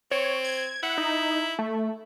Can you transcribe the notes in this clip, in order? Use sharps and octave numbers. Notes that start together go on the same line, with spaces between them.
C4 C#5
G#6
E4 F#5
D#4
A3